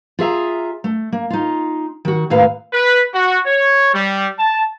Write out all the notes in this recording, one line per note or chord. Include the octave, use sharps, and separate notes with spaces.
F4 G#4 E5 A#5
A3
A#3
D#4 F4
D#3 F#4
D#2 A2 A#3 B4 F5
B4
F#4
C#5
G3
A5